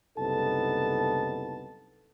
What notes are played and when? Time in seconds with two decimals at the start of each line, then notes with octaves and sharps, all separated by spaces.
0.18 F#1 C2 B3 D#4 A4 A5